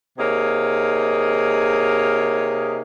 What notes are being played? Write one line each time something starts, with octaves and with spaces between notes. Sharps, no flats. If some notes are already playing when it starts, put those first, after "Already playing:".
C3 A#3 D#4 G#4 C#5